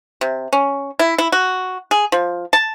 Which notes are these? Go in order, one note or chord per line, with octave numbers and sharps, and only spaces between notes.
C3
C#4
E4
E4
F#4
G#4
F3
A5